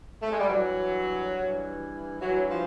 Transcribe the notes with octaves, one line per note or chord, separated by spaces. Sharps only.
A3
G#3
G3
G2 E3 F#3
G2 E3
G2 E3 F#3
F3